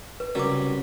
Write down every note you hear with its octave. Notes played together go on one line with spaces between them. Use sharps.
B4
C2 C#3 F#3 G3 A#4 D6